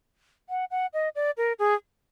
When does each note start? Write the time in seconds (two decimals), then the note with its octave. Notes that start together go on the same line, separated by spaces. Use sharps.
0.49 F#5
0.71 F#5
0.93 D#5
1.15 D5
1.37 A#4
1.59 G#4